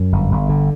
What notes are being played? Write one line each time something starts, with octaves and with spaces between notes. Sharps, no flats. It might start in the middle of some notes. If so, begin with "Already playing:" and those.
Already playing: F#2
G1
G1
D3